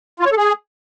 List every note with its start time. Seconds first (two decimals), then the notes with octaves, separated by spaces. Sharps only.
0.20 F4
0.26 C#5
0.32 A4
0.37 G#4